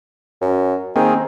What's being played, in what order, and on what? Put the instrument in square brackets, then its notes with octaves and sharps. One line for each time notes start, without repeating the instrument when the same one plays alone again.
[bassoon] F#2
[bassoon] D#3 [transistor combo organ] A#3 C4 G#4